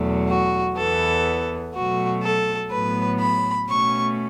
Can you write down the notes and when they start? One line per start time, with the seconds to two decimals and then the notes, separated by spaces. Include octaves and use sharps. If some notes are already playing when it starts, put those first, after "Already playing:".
Already playing: E2 B2 F#3 A3
0.29 F#4
0.77 E2 E3 B3 A4
1.75 B2 F#3 A3 F#4
2.23 A4
2.72 A2 F#3 B3 B4
3.20 B5
3.69 B2 A3 C#4 C#6